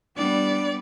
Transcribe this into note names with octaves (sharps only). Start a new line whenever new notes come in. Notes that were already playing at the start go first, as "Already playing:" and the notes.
G3 B3 D4 D5